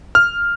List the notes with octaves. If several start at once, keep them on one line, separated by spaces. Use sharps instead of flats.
F6